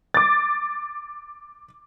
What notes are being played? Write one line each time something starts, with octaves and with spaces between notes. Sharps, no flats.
D6 A6